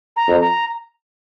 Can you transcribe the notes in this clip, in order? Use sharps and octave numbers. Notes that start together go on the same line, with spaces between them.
A#5
F2
A#5